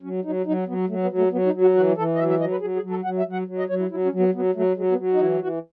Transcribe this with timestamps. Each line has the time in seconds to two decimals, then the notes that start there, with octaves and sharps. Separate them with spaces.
0.03 F#3 C#4
0.24 F#3 D#4
0.46 F#3 D#4
0.67 F#3 B3
0.89 F#3 A3
1.03 B3
1.11 F#3
1.18 A3
1.32 F#3 B3
1.46 D#4
1.54 F#3
1.61 F#4
1.75 E3 F#4
1.97 E3 A4
2.15 D#5
2.18 F#3 E5
2.30 E5
2.40 F#3 D#5
2.51 B4
2.61 F#3 G#4
2.76 G#4
2.83 F#3
2.90 A4
3.04 F#3 F#5
3.19 E5
3.26 F#3
3.33 F#5
3.47 F#3
3.59 D#5
3.69 F#3 C#5
3.79 E4
3.91 F#3 E4
4.05 C#4
4.12 F#3
4.19 B3
4.34 F#3 B3
4.55 F#3 A3
4.77 F#3 G#3
4.92 B3
4.98 F#3
5.13 D#4
5.20 E3 E4
5.41 E3 F#4